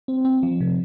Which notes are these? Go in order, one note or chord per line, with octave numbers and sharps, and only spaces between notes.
C4
C4
F3
C3